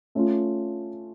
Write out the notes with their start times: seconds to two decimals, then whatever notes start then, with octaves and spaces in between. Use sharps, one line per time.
0.15 A3 C#4 F4